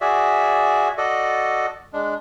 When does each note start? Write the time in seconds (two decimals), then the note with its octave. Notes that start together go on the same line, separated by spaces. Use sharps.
0.01 F#4 G#4 D5 E5
0.97 F#4 A4 D5 D#5
1.93 G#3 D4